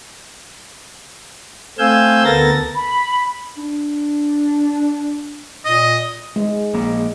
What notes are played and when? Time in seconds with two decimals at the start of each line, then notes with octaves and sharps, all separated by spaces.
1.79 A3 C4 F5 G#5 E6 G6
2.25 D2 B3 A4 A#4 A6 A#6
2.75 B5
3.57 D4
5.65 A#2 D#5
6.36 G#3
6.74 A#1 A#3